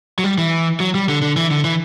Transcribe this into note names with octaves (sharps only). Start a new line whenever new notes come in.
F#3
G3
E3
F#3
G3
D3
D3
E3
D3
E3